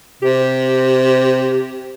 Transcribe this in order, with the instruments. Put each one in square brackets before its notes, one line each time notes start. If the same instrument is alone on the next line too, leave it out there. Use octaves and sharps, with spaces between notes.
[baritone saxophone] C3 [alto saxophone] G4